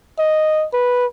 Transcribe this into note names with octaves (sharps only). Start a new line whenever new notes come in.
D#5
B4